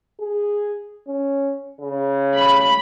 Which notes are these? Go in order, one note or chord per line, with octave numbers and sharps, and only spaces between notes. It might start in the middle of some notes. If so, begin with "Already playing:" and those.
G#4
C#4
C#3
B5